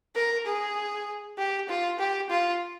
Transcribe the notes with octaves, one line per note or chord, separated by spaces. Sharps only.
A#4
G#4
G4
F4
G4
F4